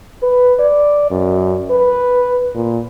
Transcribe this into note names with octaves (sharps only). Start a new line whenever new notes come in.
B4
D5
F#2
B4
A#2